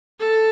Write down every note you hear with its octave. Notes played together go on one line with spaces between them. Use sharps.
A4